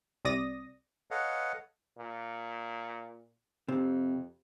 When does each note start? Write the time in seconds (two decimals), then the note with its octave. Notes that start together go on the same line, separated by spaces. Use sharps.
0.25 C2 C3 D5 D#6 A#6
1.11 A4 B4 C#5 D#5 F5 F#5
1.98 A#2
3.68 F2 C3